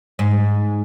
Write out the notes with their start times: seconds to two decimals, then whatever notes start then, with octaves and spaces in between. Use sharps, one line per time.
0.19 G#2